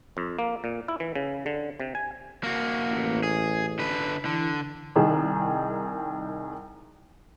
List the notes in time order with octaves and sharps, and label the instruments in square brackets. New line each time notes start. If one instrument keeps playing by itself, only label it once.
[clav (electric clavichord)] F2
A#3
A#2
E4
E3
C#3
D3
C3
G#5
[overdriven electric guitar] A#3 F#4
[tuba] A1
[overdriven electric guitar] G#4
D3 B4
[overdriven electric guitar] D3 [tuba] E3
[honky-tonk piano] C2 D#3 G#4